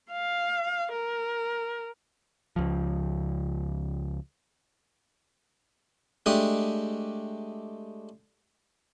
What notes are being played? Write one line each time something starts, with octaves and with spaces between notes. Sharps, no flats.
F5
A#4
C#2 F3
G#3 A3 D4 G4 D#5